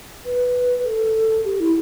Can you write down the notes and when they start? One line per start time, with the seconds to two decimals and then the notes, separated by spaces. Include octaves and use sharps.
0.25 B4
0.84 A4
1.44 G4
1.60 E4